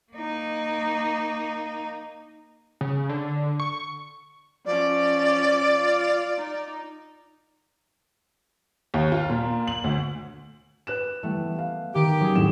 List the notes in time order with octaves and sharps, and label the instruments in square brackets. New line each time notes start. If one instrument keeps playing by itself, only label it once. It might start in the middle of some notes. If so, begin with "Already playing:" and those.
[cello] A#3 D#4
[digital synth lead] C#3
D3
C#6
[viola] F3 C#4 [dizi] D5
[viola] F4
D#4
[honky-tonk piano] D#2
F4
A#2
F#7
D2
[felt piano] B4 F#6 E7
[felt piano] E3 G3 [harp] A3 B3
[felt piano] F5
[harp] D#3 [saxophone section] G4
[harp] F#3 C#4 G#4
[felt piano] F2 A2 E7